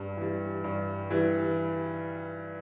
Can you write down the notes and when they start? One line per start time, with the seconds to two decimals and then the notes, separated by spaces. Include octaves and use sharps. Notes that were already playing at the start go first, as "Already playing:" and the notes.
Already playing: G2
0.17 E3 G3
0.64 G2
1.10 E3 G3